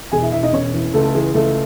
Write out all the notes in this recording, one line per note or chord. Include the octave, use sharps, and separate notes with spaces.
E1 G#4 G#5
E4 E5
E1 E4 E5
D#4 D#5
E1 C#4 C#5
E3
C#2 A3 A4
A4
E3 G#4
C#2 A3 A4